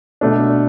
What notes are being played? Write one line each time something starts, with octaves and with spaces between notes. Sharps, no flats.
B2 A3 D4